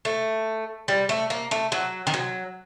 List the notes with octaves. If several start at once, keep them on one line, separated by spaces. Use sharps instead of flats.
A3
G3
A3
A#3
A3
F#3
D#3
F#3